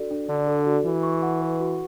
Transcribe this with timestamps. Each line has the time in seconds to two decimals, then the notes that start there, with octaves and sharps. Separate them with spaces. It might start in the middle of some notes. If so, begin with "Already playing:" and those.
Already playing: D4 F#4 A4 D5
0.11 D4
0.29 D3 D5
0.47 A4
0.66 F#4
0.85 E3 F#4
1.03 C#6
1.23 F#5
1.42 B4
1.60 F#4